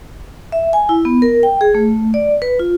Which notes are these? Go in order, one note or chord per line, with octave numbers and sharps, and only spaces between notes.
E5
G#5
E4
B3
A#4
G5
G#4
A3
D5
B4
F4